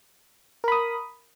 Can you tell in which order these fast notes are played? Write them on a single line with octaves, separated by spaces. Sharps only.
A#4 B5 D#6